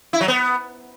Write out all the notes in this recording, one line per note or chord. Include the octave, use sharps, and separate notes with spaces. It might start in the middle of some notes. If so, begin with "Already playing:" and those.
E4
F#3
B3